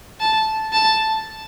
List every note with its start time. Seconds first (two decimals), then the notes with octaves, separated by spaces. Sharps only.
0.20 A5
0.73 A5